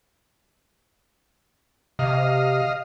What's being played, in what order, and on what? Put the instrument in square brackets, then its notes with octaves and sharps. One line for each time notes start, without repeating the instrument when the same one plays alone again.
[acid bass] C3 [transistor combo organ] D#5 F5